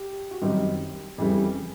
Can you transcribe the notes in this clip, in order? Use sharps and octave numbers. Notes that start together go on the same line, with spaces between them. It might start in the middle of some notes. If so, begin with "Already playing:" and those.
Already playing: G4
F#4
F#2 D#3 G3 C4 D#4 G4
F2 C#3 E3 G3